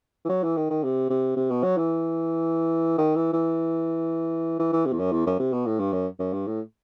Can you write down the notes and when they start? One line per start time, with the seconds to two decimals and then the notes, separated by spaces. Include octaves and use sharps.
0.25 E3
0.29 F#3
0.43 E3
0.57 D#3
0.70 D#3
0.84 C3
1.10 C3
1.36 C3
1.50 B2
1.63 F#3
1.77 E3
2.98 D#3
3.15 E3
3.33 E3
4.59 E3
4.73 E3
4.86 C3
4.92 E2
4.99 F#2
5.12 E2
5.26 F#2
5.39 C3
5.53 B2
5.66 A2
5.79 G2
5.93 F#2
6.19 F#2
6.33 G2
6.47 A2